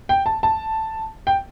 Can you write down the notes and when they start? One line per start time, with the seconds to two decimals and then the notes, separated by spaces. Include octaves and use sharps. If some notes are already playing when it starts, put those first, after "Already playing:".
0.09 G5
0.26 A5
0.43 A5
1.27 G5